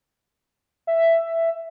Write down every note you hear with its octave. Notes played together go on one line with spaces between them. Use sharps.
E5